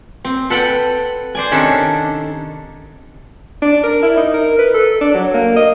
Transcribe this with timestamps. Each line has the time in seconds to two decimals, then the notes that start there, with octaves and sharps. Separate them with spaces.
0.25 C4
0.50 A4 B4 F#5 G5 A5
1.35 C5 D5 G#5
1.51 C3 D#3 C#4 D4 A4
3.62 D4
3.84 A#4
4.03 E4
4.17 D#4
4.34 A#4
4.59 B4
4.74 A4
5.01 D4
5.14 F#3
5.34 A#3
5.56 D#5